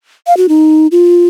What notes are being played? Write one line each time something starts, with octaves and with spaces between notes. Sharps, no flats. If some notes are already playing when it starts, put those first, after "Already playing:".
F5
F#4
D#4
F4